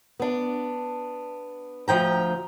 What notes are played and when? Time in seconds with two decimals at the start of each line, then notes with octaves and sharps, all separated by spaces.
0.20 B3 D4
1.88 D2 F3 G5 A#5